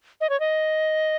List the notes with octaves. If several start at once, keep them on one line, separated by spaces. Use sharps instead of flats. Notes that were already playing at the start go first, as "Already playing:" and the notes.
D#5
C#5
D#5